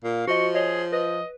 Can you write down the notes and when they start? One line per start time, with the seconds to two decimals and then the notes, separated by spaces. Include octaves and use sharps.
0.04 A#2 F5
0.27 F3 F#4 D#5 C#6
0.55 G#4 C#5 D#5
0.92 B4 D#5